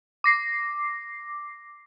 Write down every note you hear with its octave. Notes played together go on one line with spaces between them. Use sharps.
D6 A#6 C7